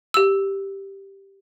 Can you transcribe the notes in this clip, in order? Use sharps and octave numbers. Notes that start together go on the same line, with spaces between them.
G4 E6